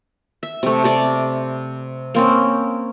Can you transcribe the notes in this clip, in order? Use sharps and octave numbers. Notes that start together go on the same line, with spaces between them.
E5
C3 A3
C3 D5 D6
A#3 C4 C#4